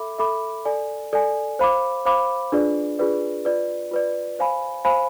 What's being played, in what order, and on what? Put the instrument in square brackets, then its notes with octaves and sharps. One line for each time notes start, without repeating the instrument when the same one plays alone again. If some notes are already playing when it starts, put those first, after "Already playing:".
Already playing: [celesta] A4 E5 B5 D6
A4 E5 B5 D6
A4 D5 G#5
A4 D5 G#5
C5 F5 B5 D6
C5 F5 B5 D6
D4 F4 G#4 B4 D5
D4 F4 G#4 B4 D5
F4 B4 D5
F4 B4 D5
C5 F5 G#5 B5
C5 F5 G#5 B5